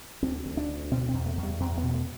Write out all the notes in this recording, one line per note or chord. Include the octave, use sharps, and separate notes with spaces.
D2 C4
D2
D4
D2
B2 C4
C4
E2
A3
E2
G3
E2 C4
B3
B2
B3
A3